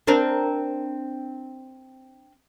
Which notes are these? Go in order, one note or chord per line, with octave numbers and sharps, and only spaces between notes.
C4 D4 A#4